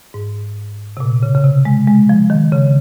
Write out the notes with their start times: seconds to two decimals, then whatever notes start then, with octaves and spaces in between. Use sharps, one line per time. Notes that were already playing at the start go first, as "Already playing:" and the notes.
0.14 G#2
0.97 C3
1.00 A#2
1.23 C#3
1.35 C#3
1.44 C3
1.65 G#3
1.88 G#3
2.09 F3
2.30 D#3
2.52 C#3